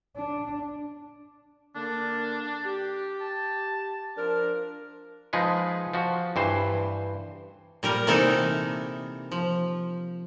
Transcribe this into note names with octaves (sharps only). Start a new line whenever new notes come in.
D4
D3 A#3 D4
G4
A5
F3 D4 A#4
F3 G#3 D#4 G#4 B4
F3 F#4
G2 E3 C5
A#2 G3 A#4
C3 E3 A#3 D#4 A4
F3